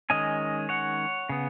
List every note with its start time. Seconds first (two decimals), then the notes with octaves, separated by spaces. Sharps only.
0.10 D#3 G#3 C#4 D#5 G#5
0.69 C#5 F#5
1.29 C#3 B3